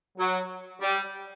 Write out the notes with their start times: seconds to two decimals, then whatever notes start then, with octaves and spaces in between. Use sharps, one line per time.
0.18 F#3
0.80 G3